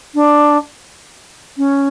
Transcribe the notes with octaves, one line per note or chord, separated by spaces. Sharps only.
D4
C#4